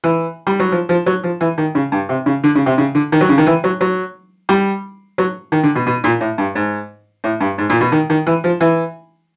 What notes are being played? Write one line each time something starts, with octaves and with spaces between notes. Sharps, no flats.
E3
G3
F#3
F3
F3
F#3
F3
E3
D#3
C#3
G2
C3
C#3
D3
C#3
C3
C#3
D3
D#3
F#3
C#3
D#3
E3
F#3
F#3
G3
F#3
D#3
D3
B2
B2
A#2
A2
G2
G#2
A2
G2
G#2
A#2
B2
D#3
D#3
E3
F3
E3